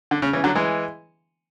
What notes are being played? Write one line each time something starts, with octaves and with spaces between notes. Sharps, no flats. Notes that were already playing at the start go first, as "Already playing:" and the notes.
D3
C#3
C#3 E3
D3 F#3
E3 G#3